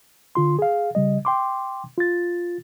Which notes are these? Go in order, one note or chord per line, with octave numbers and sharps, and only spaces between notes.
D3 F4 C6
G#4 F5
C#3 G3 D#5
G5 C6 D6
F4 A6